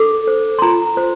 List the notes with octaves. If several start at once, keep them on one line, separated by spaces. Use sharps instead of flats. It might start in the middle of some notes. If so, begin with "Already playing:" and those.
Already playing: D4 A4 D6
C5
C6
F4 A#5
C5